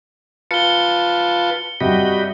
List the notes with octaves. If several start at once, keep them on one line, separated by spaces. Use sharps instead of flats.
F4 B4 A5 C#7 G7
G2 C3 F#4 G4 D#5 B5